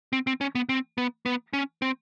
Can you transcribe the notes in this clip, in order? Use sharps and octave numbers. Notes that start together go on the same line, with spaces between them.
C4
C4
C#4
B3
C4
B3
B3
C#4
C4